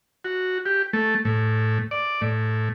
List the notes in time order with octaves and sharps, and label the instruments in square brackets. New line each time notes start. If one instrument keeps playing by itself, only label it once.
[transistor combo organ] F#4
G4
A3
A2
D5
A2